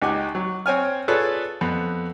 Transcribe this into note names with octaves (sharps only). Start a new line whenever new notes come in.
C#2 D#4 G4 F#5 G#5 D6
F#3
C4 C#5 G#5 F6
F4 G#4 A4 B4 C#5 D5
F2 B3